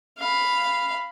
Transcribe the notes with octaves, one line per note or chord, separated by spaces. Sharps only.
F5 B5